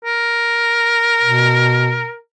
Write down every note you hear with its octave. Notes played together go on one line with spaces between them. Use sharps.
A#4
B2